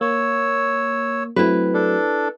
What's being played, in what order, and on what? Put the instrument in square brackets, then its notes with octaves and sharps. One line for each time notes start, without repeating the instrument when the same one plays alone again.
[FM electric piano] A#3 [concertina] C#5 E6
[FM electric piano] F#3 A3 C4 [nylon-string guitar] E4 B4
[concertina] D4 A4